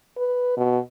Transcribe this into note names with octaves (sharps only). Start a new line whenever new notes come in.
B4
B2